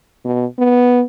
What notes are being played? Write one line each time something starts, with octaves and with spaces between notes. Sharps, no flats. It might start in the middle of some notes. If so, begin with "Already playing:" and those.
B2
B3